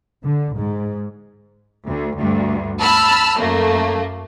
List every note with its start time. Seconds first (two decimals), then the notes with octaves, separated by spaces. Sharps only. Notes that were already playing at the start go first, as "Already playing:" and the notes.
0.24 D3
0.55 G#2
1.87 D2
2.17 D2 G2
2.81 A5 B5 E6 F6
3.38 F#2 A3 A#3